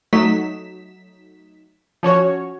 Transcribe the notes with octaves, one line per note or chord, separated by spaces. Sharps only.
F#3 A3 D#4 B6 E7
F3 C#4 F#4 C#5